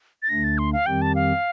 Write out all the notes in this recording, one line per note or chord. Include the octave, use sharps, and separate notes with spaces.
A6
D2 D3 A3 D4 A#6
A6
C6
F5
F2 D#3 G3 C4 G4 G5
A5
F5